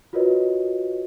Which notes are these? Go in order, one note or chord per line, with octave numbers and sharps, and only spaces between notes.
F4 F#4 A#4 B4 C#5 D#5